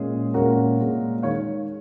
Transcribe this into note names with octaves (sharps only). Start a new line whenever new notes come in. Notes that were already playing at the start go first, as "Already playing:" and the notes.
Already playing: A#2 G#3 C#4 G#4
A#2 G#3 C#4 F#4 A#4
A#2 G#3 C#4
D#3 G#3 C#5 F5